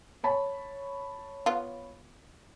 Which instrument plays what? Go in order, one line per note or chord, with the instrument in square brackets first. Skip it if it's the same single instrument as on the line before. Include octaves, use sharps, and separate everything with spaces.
[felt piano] C#5 A5 B5
[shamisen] B3 F4